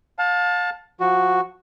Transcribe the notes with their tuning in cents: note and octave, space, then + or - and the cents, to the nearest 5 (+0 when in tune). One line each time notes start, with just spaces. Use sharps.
F5 +35 A5 +0
F3 +20 F#4 +0